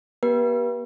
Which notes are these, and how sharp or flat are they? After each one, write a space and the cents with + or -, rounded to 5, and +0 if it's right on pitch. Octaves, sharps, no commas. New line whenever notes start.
B3 -45 G4 -25 B4 -40